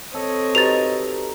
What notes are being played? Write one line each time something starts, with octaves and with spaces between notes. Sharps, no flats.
C4 A4 C#5 D#5
D#4 F#4 G4 B4 A6 F7